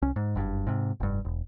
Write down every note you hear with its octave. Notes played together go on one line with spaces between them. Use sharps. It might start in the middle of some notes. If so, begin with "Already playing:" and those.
C2 C#4
G#2
F#1 G2
G#2 C3
F1 G2
E1